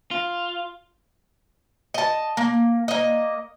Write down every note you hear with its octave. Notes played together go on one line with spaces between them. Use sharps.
F4
D#5 A5
A#3
A#3 D#5